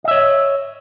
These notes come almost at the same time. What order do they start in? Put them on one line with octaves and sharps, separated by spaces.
D#5 E5 C#5